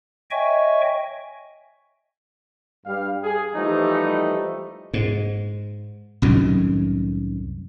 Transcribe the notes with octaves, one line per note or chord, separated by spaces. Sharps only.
C#5 D#5 E5 G5 G#5 C#6
G2 G3 G4 F5
G#4
E3 F3 G3 A3 D#4
G#2
C2 F#2 A2 D#3